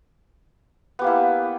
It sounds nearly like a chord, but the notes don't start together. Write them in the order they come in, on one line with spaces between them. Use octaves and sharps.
B3 G4 A#3 E4